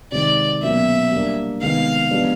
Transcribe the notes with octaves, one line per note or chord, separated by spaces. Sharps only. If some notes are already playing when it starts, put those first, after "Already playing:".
C3 D#3 G#3 D5
B2 F#3 A#3 C#4 E5
G3 A#3 D4
C3 D#3 G#3 B3 F5
F3 G#3 B3 D4 G4